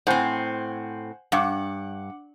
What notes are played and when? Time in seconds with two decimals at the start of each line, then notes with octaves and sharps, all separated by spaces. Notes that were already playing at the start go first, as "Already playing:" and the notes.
0.07 A2 C4 C5 F#5 G#5
1.32 G2 F#5 D6